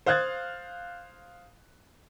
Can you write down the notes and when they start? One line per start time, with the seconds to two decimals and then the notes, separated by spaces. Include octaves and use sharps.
0.06 C5 F5 D#6 F#6 G#6 A6